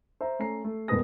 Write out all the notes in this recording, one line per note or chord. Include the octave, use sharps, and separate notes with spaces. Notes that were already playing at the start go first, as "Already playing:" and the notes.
C5 E5 A#5
A3 C#4 A#5 C7
A3
D#1 B2 A#4 B4 D#6 A#6